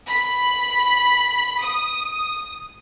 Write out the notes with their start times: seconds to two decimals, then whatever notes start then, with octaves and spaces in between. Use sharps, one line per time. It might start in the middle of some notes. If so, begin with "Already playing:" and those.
0.10 B5
1.63 D#6